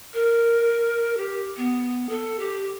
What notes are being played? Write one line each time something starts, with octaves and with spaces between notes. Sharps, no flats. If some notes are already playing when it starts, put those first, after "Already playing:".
A#4
G4
B3
A4
G4